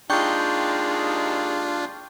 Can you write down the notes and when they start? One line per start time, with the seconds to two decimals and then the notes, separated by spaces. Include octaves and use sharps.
0.10 D#2 G#3 D4 F4 G5 C#6 G6